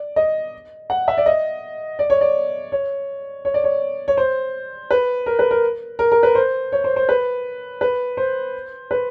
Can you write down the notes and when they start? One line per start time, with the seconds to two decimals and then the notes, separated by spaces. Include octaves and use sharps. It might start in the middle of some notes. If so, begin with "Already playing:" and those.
Already playing: D5
0.16 D#5
0.90 F#5
1.08 E5
1.17 D5
1.26 D#5
1.99 D5
2.10 C#5
2.21 D5
2.72 C#5
3.45 C#5
3.54 D5
3.64 C#5
4.08 C#5
4.17 C5
4.91 B4
5.26 A#4
5.39 B4
5.51 A#4
5.99 A#4
6.12 A#4
6.23 B4
6.35 C5
6.72 C#5
6.84 C5
6.96 C5
7.09 B4
7.81 B4
8.17 C5
8.91 B4